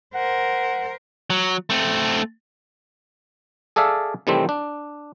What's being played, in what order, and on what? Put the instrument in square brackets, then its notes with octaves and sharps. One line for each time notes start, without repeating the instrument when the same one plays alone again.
[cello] A#4 C5 [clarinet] F#5
[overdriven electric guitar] F#3
A3 C4
[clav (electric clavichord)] G#4 A4 D5 E5 F5
C3 D#3 E3 G3 A3 C4
D4